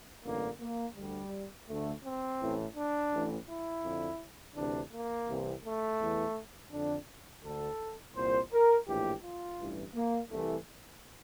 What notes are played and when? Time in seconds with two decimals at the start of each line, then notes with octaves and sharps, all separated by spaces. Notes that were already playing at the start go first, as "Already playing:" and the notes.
0.24 A1 G2 D3 A#3
0.61 A#3
0.96 D2 D3 G3
1.68 D2 D3 A3
2.04 C4
2.40 A1 A2 E3
2.76 D4
3.12 A1 A2 E3
3.48 E4
3.84 F2 D3
4.56 D2 C3 E3 D4
4.93 A#3
5.28 C2 C3 E3
5.64 A3
6.00 E2 E3
6.72 F2 D3 D4
7.44 D2 D3 A4
8.15 C2 A#2 C5
8.52 A#4
8.88 A#1 A2 E3 G4
9.23 F4
9.59 A1 G2 E3
9.95 A#3
10.31 C2 C3 E3 A3